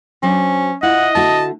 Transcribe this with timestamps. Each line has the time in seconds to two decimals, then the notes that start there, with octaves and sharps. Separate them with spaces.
0.23 F#3 C#4 D4 C5
0.83 E4 F4 D#5 F#5
1.15 D3 A3 F#4 A5